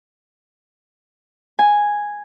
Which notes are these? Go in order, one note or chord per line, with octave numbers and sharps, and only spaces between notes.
G#5